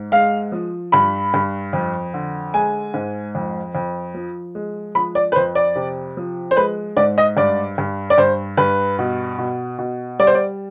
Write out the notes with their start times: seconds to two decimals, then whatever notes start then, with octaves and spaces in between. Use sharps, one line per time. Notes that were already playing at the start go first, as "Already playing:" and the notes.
Already playing: G#2
0.12 G#3 F5
0.52 F3
0.92 G2 B5
1.34 G2
1.73 F2
2.14 D3
2.54 G#3 G#5
2.94 G#2
3.35 F2
3.75 F2
4.14 F3
4.55 G#3
4.95 F3 B5
5.15 D5
5.32 B4
5.35 F2 C5
5.55 D5
5.76 C3
6.17 F3
6.51 C5
6.56 G#3 B4
6.97 G#2 D5
7.18 D#5
7.37 G2 D5
7.78 G2
8.10 D5
8.18 G2 C5
8.57 G2 B4
8.99 B2
9.38 B2
9.79 B2
10.19 G3 D5
10.27 C5
10.35 D5